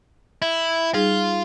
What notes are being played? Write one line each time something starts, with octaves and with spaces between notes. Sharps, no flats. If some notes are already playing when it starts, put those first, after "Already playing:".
E4
G3 D#4 F4 G#4